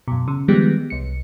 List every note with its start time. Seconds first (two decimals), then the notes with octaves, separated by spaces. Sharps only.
0.08 F#2 B2
0.28 C#3
0.48 D#3 F3 G3 G#3 B3 G4
0.90 C2 C#7